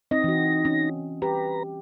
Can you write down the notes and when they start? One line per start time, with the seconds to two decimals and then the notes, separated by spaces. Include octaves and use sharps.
0.11 C4 D#4 D#5 A#6
0.24 E3 F#4
0.65 C#4
1.22 G4 B4 A#5